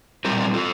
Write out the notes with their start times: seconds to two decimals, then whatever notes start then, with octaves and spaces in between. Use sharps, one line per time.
0.25 A#2 G3 C4 G4 A#4
0.54 F4 A4